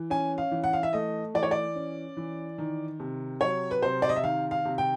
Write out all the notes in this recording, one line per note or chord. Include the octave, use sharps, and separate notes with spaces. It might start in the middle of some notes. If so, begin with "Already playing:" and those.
Already playing: E3
C#4 G#5
F5
E3
F#5
F5
E5
A3 D#5
E3 D5
C#5
D5
C#4
E3
D#3
C3
F#3 C#5
B4
C3 C5
D5
D#5
E5
D#3 F5
F5
C3
G5